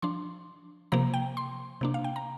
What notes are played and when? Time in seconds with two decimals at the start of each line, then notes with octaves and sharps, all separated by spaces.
0.02 F3 D4 C6
0.92 C3 F3 A#3 A#5
1.14 G5
1.37 C6
1.81 C3 A#3 D4
1.94 F5
2.04 G5
2.16 A#5